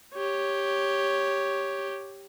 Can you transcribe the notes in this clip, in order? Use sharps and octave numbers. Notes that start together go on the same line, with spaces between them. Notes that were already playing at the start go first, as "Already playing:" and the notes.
G4 C#5